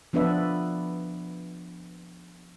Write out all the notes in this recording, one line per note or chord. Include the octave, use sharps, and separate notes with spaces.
F3 B3 D4 B4 E5